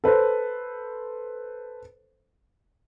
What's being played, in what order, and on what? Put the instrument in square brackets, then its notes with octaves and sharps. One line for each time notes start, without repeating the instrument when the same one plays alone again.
[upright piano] A4 B4 C5